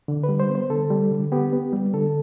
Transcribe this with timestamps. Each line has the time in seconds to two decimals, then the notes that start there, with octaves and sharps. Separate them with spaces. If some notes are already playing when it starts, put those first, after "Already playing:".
0.08 D3
0.23 B4
0.29 G3
0.40 C5
0.50 B3
0.55 C5
0.70 D3 A4
0.90 G3
1.12 D3
1.32 B3 G4
1.53 B3
1.73 G3
1.94 D3 A4